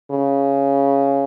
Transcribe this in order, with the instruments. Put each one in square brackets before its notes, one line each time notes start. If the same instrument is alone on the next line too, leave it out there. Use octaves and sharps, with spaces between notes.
[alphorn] C#3